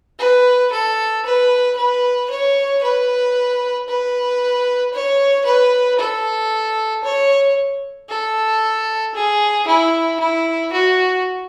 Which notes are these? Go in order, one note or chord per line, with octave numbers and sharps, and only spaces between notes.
B4
A4
B4
B4
C#5
B4
B4
C#5
B4
A4
C#5
A4
G#4
E4
E4
F#4